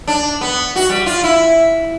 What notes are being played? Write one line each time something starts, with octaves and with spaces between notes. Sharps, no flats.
D4
B3
F#4
G3
F4
E4